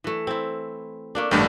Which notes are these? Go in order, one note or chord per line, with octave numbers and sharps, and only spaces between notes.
E3 A3
C4 E4
A3 A#3 D4
A1 G2 D3 A3 G5